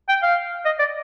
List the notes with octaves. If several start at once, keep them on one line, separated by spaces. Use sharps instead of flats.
G5
F5
D#5
D5